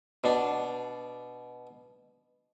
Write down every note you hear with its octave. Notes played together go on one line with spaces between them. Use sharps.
B2 D4